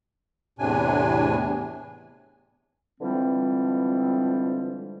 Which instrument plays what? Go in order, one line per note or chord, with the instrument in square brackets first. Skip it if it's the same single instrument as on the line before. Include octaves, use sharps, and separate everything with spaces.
[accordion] E2 A2 C3 D4 G#5
[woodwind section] D3 E3 F3 G3 G#3 C4